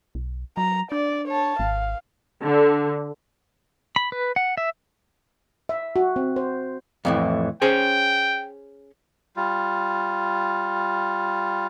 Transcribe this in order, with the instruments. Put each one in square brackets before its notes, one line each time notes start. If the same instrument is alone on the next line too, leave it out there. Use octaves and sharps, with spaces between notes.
[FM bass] B1
[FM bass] F#3 [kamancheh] A#5
[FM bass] D4 [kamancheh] D5
[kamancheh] C#5 A5
[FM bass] G#1 [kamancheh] F5
[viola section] D3
[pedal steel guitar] B5
B4
F#5
E5
[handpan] E5
F#4
C4
C5
[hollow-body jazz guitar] F2 A2 E3
[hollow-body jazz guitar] C#4 G#4 C5 [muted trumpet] G5
[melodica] G3 F4